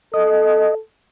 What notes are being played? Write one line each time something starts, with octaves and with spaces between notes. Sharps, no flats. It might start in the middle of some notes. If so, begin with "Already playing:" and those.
A4 D#5